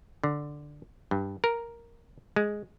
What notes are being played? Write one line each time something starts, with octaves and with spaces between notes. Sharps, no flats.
D3
G2
A#4
G#3